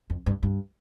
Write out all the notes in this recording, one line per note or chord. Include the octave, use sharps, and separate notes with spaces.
F2
G2
G2